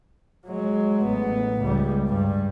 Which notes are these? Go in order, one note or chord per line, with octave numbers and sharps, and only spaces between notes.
F#3 G#3
A1 B3
C#2 G3
G2 G3